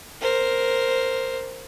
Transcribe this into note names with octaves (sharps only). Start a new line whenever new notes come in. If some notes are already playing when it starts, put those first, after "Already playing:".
A#4 C5